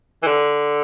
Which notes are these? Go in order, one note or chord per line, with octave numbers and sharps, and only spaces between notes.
E3
D3